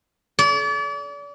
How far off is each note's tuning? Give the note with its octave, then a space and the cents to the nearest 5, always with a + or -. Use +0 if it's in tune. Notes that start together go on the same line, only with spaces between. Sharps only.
D5 -40